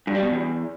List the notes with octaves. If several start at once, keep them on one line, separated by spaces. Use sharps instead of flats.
G2
G3
B2
E2